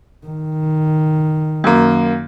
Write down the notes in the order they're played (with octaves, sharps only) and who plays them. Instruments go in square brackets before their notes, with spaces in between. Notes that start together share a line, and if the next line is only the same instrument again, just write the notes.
[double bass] D#3
[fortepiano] F#2 A#3